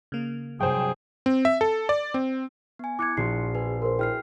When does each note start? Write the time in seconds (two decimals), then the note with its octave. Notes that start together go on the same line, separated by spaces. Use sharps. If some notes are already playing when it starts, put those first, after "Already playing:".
0.12 C#3 A#3
0.61 G2 C3 F#3 G#4 C5 G5
1.26 C4
1.45 E5
1.61 A4
1.89 D5
2.14 C4
2.79 B3 G#5
2.99 E4 G#5 D6 F#6 G#6 C#7
3.17 A#1 F#4 C6 C7
3.55 G#4 B4
3.82 A#4 C5 C6
3.99 E4 B4 G5 F6 C7